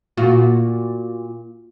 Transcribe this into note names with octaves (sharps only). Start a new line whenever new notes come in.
A#2 F4 F#4